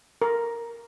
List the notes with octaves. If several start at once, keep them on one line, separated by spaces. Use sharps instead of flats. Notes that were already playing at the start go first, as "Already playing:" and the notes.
A#4